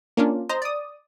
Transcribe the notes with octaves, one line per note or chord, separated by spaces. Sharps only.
A#3 C#4 D4 F4
C5 D#5 A#5
D5 D#6